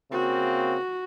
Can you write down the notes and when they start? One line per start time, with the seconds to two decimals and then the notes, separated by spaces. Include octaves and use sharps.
0.11 C#3 A#3 C4 F#4